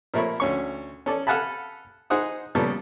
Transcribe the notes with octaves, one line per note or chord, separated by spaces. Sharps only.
A#2 F3 A3 A#4 C#5 B5
D2 C#4 C#6
C#4 A4 D5
A4 F5 F#5 G#5 A5 B5
D#4 G#4 C5 F#5 D#6
A#2 C#3 G3 B3 A4